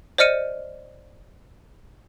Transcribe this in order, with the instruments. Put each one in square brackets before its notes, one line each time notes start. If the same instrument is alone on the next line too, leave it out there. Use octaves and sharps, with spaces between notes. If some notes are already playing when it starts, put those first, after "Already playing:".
[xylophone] C5 D5 D#5 F6 C#7 D#7